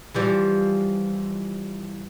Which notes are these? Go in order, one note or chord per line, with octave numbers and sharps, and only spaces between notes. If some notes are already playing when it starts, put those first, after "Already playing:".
E3 F3 G3